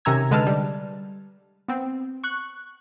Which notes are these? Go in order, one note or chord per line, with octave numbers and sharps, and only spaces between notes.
C3 D#3 C#4 A#5 E6 G#6
D3 G#3 B4 A5 F6
G3
B3 C4
C#6 F#6